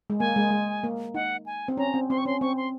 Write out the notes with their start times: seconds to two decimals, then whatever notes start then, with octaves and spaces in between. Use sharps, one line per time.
0.10 G#3
0.19 A#3 G#5
0.36 G#3
0.51 G#3
0.84 A#3
1.14 D#4 F#5
1.46 G#5
1.68 C4
1.77 C#4 A#5
1.94 C4
2.10 C4 C6
2.18 C#6
2.25 C#4 C6
2.41 C4 C#6
2.57 C6